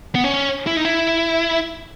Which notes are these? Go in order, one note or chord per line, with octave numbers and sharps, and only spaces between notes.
B3
C#4
E4
D#4
E4